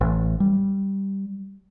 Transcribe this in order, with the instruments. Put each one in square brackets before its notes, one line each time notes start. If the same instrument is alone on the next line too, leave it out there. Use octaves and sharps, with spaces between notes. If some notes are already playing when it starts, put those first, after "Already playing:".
[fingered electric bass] A1
G3